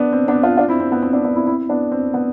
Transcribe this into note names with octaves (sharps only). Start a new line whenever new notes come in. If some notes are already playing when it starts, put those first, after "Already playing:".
Already playing: B3 D4
C4
B3 D4
D4 F4
D4 F4
C4 E4
C4
B3
C4
B3 D4
B3 D4
C4 E4
C4 E4
B3 D4
C4
B3